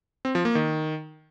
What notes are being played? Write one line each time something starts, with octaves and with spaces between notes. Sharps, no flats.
C4
F3
A#3
D#3